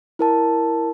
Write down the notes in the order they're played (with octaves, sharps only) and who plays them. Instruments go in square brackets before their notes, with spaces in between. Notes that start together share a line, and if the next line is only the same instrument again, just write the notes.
[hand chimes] E4 A#4 A5